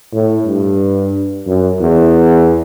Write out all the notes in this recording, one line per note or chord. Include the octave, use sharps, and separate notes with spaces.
A2
G2
F#2
E2